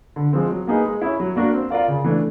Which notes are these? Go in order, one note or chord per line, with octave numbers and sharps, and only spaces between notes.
D3
F3 G#3 C4
F#3
A#3 D#4 G#4 B4
G#3
C#4 E4
F#3
A#3 D4 F#4 A#4
C4
F4 A#4 D5 F5
C#3
E3 A3 D4